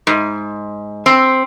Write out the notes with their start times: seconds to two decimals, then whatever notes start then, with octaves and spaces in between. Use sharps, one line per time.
0.07 G#2
1.06 C4